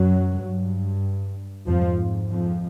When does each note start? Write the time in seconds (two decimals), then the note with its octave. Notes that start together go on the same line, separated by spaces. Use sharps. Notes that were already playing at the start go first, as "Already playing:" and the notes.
Already playing: F#2 F#3
0.43 G2
1.67 F2 G#2 F3
2.29 F2 F3